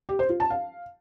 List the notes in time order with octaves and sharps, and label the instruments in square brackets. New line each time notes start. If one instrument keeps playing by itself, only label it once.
[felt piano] G4
C5
F4
A5
F5